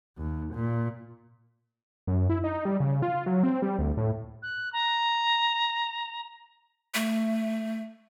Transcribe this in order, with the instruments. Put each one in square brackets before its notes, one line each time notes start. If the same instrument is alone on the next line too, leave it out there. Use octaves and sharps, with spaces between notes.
[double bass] D#2
A#2
[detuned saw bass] F#2
E4
D#4
G3
C#3
F4
F#3
C4
G3
D2
A2
[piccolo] F#6
A#5
[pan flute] A3